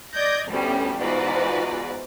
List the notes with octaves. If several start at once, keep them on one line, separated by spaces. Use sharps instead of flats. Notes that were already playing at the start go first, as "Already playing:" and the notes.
D5 D#5 G6 G#6 A#6
D2 A2 G3 B3 C#4
E2 G#2 F4 F#4 B4 D5